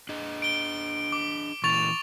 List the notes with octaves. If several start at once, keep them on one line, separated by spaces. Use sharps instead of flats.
D4 G#4 D#5
D7 G7
D6
A#2 E3 C#6 A6 F7